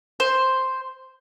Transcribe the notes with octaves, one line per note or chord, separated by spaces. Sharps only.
C5